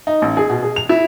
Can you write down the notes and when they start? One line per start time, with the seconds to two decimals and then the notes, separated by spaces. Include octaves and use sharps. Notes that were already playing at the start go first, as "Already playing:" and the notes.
0.07 D#4
0.22 A1
0.37 G#4
0.50 B2
0.63 G#4
0.76 F7
0.89 E4